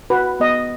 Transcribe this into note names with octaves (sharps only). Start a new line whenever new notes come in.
F#4 B4
B3 D#5